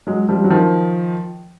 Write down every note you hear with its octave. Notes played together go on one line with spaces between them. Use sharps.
F#3 G#3
F3 G3
F#3
D#3 F3